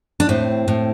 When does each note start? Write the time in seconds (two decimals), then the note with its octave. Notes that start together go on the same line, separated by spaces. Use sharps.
0.20 D4
0.29 A2 C4
0.68 A2